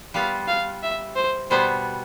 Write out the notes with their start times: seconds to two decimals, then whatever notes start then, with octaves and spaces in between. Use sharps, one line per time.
0.14 G3 B3 F4 F5
0.48 F5
0.83 E5
1.16 C5
1.50 B2 G3 B3 C5